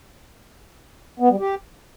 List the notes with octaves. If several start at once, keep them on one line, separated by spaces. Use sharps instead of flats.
B3
G3
G4